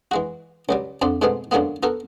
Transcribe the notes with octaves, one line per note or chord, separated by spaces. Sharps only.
E3 G#3 F#4
C#2 F#3 G3
F2 D3 C4 D5
G#2 B2 G#3 A3 B3 C4
F#2 D3 D#3 G#3 A#3 B3
B3 F#4 A4 A#4